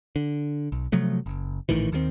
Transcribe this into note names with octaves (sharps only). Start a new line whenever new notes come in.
D3
B1
C3 F3 F#3 A3
F#1
A#1 A2 D#3 E3
D#2 D#3 F3 C4